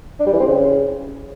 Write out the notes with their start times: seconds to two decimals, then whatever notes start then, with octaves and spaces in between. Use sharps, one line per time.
0.20 D4
0.27 G3
0.33 E3
0.40 C4
0.47 C#3